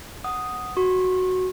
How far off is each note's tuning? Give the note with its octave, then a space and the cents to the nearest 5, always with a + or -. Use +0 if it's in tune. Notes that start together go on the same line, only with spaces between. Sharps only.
F#5 +0 D#6 +0
F#4 +0 C#6 -30